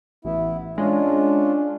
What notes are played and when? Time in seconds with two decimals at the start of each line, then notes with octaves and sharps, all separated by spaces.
0.25 A1 B3 E4
0.78 G#3 C#4 D4 F4